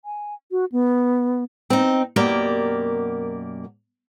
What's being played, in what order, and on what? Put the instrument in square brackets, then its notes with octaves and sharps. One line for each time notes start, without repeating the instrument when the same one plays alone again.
[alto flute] G#5
F#4
B3
[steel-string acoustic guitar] C4 D#4
F#2 B2 A#3 G4 A#4 D5